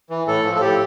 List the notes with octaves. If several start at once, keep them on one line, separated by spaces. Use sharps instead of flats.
E3
A2 A4
F3
A4
A2 G4